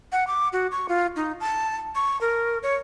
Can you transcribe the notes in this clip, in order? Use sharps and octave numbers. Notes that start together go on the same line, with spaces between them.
F#5
D6
F#4
C#6
F4
D#4
A5
C#6
A#4
C#5